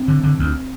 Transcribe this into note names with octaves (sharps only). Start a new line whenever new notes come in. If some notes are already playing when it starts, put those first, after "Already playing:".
Already playing: C4
D3
D3
D2